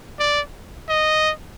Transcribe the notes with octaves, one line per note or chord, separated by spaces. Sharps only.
D5
D#5